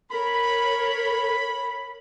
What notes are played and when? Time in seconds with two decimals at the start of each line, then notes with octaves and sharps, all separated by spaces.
0.12 A#4 C#5 B5